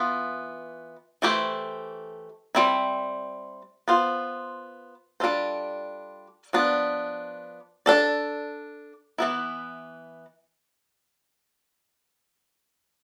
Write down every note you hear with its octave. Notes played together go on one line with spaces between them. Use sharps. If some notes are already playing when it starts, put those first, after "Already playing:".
Already playing: E3 B3 F4
E3 A3 E4 G4 C5
G3 C4 E4
B3 F4 C5
G3 D4 F4 A4 C5
F3 B3 D4
D4 A4 D5
E3 B3 E4